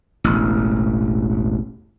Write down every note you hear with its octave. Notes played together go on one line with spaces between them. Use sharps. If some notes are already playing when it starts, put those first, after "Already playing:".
E1 A1